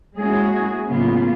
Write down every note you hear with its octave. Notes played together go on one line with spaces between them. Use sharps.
G#3 A#3 C#4 E4 F#4 G#4
A2 C#3 F#3 A#3 B3 F4